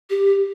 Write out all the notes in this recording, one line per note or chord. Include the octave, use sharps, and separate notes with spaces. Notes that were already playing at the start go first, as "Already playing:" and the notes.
G4